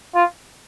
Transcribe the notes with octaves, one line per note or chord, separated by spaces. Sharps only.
F4